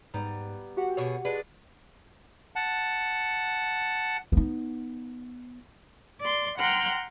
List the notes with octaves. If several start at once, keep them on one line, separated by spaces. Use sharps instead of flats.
G#2 G3 B3 A#5
F#4 G4 F#5
B2 G#4 C#5
G#3 D4 B4
F#5 A5
B3 D#4
D5 C6
F#5 G5 A#5 C6 F6 F#6